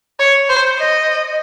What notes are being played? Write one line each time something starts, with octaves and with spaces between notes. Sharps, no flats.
C#5
C5
D#5